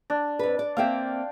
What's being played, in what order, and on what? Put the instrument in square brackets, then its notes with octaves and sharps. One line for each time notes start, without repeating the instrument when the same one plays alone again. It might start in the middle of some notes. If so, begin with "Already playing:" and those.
[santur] D4
[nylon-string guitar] F2 B4
D5
[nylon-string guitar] A#3 C4 E5 [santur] F5 G5